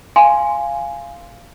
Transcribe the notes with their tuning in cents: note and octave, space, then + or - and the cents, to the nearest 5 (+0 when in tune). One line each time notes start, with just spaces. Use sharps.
F5 -10 G#5 +0 C6 +0